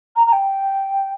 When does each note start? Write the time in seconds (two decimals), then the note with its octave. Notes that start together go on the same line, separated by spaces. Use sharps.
0.16 A#5
0.27 A#5
0.33 G5